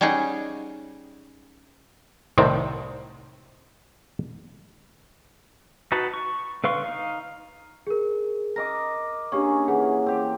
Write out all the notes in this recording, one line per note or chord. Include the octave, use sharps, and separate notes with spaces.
G3 C#4 D#4 G#4 F#5
C2 A2 C3 D#3 C4
D#4 F#4 B4 F#5 A5
C#6
D3 B4 F5 C6 C#6
D#4 F5
G#4 A#4
A#4 D#5 D6 A#6
A#3 C#4 D4 G4 G#4 C#6
E3 G#4 F#5
C4 G4